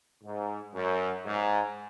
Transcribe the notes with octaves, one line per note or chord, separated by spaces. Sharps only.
G#2
F#2
G#2